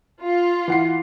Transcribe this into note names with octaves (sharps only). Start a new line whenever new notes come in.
F4
E3 F#5 C7